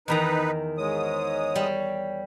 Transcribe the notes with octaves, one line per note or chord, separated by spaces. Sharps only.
E2 D#3 D#4 B4 A#5
G#2 G#3 C#5 D#6
G3